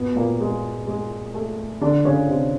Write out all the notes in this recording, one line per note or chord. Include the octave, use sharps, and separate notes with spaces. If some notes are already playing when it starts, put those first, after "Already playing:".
Already playing: B2 B3
A#2 A#3
G#3
G#3
A3
D3 D4
C#3 C#4
C3 C4